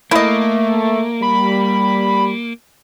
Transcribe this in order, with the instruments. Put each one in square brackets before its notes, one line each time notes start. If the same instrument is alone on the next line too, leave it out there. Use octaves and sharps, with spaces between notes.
[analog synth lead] A3 [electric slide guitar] A#3 [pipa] E4 D#5
[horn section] G3 [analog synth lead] B5